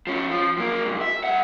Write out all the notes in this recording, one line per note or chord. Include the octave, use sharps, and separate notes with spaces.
F3 C#4
F3
F#2 A#3
C2 F#2
E5
G2 F#5